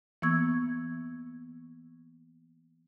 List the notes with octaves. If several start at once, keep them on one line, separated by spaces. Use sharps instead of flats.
E3 A#3 B3 C#6 E6 G#6